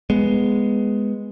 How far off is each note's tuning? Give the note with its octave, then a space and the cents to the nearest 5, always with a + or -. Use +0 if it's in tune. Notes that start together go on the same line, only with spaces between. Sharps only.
G#3 +0 B3 +0